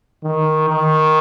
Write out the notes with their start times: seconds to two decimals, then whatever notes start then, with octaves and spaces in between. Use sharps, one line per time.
0.23 D#3
0.70 D#3